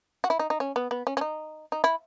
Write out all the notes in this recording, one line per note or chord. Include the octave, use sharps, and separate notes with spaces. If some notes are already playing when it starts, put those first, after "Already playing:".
F#4
E4
D#4
D#4
C#4
B3
B3
C#4
C#4
D#4
D#4
E4